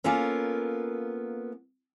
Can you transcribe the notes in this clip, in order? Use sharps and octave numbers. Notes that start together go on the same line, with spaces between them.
A#3 B3 C#4 F4 A4 A#4